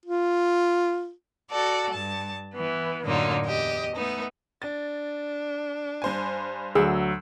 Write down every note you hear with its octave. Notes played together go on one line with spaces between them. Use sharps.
F4
F#4 A4 D5
G2 A5
E3 B3
F#2 A2 D3 A#3 D#4 F4
E2 G4 D#5
A3 B3 D#4
D4 A6
G2 C5 G#5
D2 F#3 G#4 E6